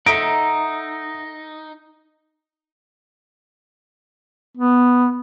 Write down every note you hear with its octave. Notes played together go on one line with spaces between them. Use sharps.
D#4 A4 E5 F#5 A#5 D#6 E6 D7
B3